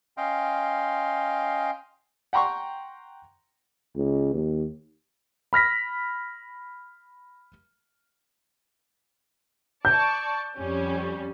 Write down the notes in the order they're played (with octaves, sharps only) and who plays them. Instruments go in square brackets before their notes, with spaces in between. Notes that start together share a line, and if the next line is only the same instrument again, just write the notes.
[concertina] C#4 D#5 F5 G5 C6
[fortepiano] F#5 G5 A#5 C6 C#6
[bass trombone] C#2
D#2
[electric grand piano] B5 F6 A#6 B6
[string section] D5 A5 C#6 [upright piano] G6
[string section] F2 G3 C#4